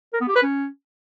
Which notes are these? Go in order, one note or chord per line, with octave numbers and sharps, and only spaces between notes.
A#4
B3
G4
B4
C#4